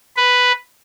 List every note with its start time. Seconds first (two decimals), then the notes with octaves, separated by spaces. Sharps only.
0.16 B4